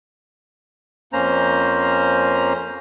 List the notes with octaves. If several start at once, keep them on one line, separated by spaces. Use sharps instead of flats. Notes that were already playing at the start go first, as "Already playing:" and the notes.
F2 A#3 C#4 C5 A#5